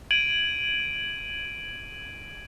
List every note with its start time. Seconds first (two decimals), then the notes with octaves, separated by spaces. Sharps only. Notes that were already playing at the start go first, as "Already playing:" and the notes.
0.11 G#6 D7 D#7 F#7